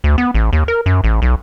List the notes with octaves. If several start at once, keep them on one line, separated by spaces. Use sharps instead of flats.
D2
B3
A1
D#2
A#4
F#2
A1
B1